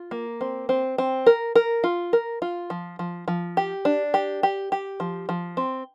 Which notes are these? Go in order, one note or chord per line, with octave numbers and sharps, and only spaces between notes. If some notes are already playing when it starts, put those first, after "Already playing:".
Already playing: F4
A#3
C4
C4
C4
A#4
A#4
F4
A#4
F4
F3
F3
F3
G4
D4
G4
G4
G4
F3
F3
C4